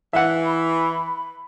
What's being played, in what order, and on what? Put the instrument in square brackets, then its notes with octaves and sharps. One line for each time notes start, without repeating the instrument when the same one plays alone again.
[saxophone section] E3 [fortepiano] E5 F#5
[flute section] B5